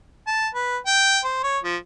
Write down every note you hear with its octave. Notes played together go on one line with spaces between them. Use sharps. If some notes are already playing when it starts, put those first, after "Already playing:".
A5
B4
G5
C5
C#5
F3